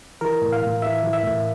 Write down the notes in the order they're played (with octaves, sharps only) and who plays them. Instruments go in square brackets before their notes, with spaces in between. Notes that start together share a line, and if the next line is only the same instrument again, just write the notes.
[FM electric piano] E3 A#4
A2
F5
A2
E3 E5
E3
E5
A2